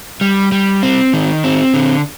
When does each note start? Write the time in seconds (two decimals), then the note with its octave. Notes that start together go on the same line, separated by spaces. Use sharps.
0.21 G3
0.52 G3
0.83 C4
1.13 D#3
1.44 C4
1.74 D3